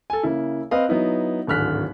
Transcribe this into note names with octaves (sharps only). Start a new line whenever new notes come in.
A4 G#5
C#3 A#3 E4
C4 B4 D#5 F5
F#3 B3 D#4 E4
D1 G#1 D3 F6 F#6 B6